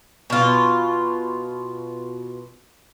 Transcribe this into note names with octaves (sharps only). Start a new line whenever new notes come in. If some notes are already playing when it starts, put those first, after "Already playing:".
B2 F4